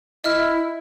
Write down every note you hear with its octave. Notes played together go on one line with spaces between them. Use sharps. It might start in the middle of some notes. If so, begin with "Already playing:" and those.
E4 D#5 E5 F6